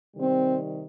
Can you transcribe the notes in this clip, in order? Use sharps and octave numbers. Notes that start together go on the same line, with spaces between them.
C3 D#3 G3 C4